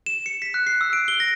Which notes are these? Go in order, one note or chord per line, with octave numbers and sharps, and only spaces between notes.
E7
C#7
B6
F#6
C7
E6
D7
G7
A#6